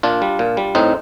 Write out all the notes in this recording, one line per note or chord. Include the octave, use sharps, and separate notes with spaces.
A#2 D4 F4
G3
A#2
G3
A2 C4 D#4